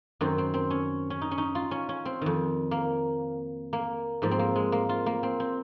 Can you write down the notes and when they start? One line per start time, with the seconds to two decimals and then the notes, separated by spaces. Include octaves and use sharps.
0.21 F#2 D#3 C4
0.38 C4
0.54 C4
0.70 C#4
1.10 C#4
1.21 D#4
1.31 C#4
1.38 D#4
1.55 F4
1.71 C#4
1.89 C#4
2.05 C4
2.22 F2 D#3
2.71 A#3
3.73 A#3
4.22 G#2 F3 A#3
4.31 C4
4.39 A#3
4.56 G#3
4.72 A#3
4.89 F4
5.06 A#3
5.23 C4
5.40 C4